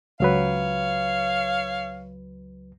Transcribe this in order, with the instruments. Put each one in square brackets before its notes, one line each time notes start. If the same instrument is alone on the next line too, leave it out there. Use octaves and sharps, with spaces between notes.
[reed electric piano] C#2 F#3 B4 [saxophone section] C#5 F5